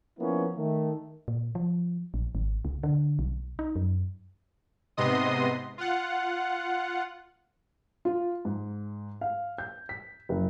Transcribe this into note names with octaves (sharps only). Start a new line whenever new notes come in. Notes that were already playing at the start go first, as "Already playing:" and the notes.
F3 A#3 B3 C#4 E4
D#3 A3
A#2
F3
A#1
G#1
C#2
D3
B1
D#4
F#2
G#2 C3 B3 D#5 C6 D#6
F4 F#5
F4
G#2
F5
G6
B6
F#1